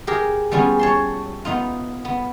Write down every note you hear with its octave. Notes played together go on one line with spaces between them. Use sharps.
G4 G#4 A#4
G3 B3 C#4 F4 G#4
C#5 A5 C6
B3 D#4 F4
B3